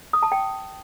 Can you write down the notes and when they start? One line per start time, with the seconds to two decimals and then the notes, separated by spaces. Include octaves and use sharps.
0.13 D#6
0.23 A5
0.32 G5